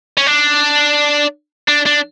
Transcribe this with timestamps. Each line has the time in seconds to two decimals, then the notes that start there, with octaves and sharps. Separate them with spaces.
0.18 C#4
0.27 D4
1.68 D4
1.86 D4